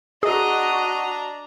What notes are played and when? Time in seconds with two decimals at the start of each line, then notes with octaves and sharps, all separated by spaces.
0.23 D4 F#4 G#4 D#5 A#5